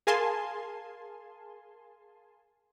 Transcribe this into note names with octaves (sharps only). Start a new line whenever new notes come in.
G#4 A#4 F5 G#5 A5 C6